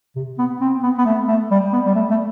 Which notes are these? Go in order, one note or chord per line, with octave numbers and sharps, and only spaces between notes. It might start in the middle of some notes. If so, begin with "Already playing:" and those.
C3
B3
C4
B3
B3
A3
A3
G3
B3
G3
A3
A3